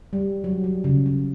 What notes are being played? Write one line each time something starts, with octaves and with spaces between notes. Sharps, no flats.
G3
F#3
F#3
C#3
C#3